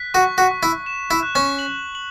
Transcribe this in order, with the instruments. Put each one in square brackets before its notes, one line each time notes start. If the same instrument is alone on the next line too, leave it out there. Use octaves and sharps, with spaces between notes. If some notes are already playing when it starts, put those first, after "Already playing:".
Already playing: [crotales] F#6 B6
[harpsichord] F#4 [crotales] C#6
[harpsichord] F#4
[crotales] C#6
[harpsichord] E4
[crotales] E7
[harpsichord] E4
[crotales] F#6
[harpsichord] C#4
[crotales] F#7
F#7